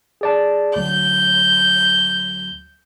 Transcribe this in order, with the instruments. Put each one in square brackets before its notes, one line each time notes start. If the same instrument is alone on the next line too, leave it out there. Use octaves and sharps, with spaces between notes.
[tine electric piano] G#4 D5 A5
[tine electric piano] D2 F#3 [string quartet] G6